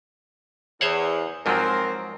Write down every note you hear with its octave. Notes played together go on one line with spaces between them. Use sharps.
E2 C5 C#5 F#5
G#2 F3 F#3 C4 A#4